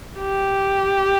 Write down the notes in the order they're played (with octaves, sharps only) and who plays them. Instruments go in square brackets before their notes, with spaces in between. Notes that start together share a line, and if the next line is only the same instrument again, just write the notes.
[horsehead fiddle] G4